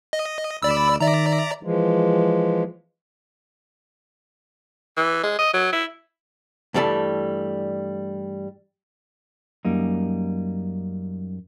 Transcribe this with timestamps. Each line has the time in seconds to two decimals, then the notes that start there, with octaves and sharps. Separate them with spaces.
0.13 D#5
0.63 D2 D5 B5 E6
1.01 D#3 D5 E5 A#5
1.63 E3 F3 G#3
4.97 E3
5.24 G#3
5.39 D#5
5.54 F#3
5.73 E4
6.74 G2 E3 G3 A3 A5
9.65 F#2 G3 A#3 D#4